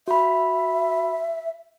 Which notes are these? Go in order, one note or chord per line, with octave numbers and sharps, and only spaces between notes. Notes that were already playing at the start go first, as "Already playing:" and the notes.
F#4 E5 B5